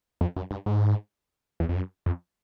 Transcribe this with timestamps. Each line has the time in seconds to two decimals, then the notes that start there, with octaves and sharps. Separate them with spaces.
0.21 F2
0.36 F#2
0.51 G2
0.66 G#2
1.60 E2
1.69 F2
1.76 F#2
2.06 F2